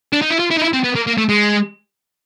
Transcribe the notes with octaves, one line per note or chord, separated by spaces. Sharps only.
D4
D#4
E4
F4
E4
D#4
E4
C4
B3
A#3
A#3
A3
G#3